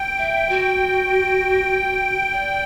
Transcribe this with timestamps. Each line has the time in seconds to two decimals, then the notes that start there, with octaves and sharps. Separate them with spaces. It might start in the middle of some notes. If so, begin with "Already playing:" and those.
Already playing: G5
0.19 E5
0.49 F#4
2.33 D5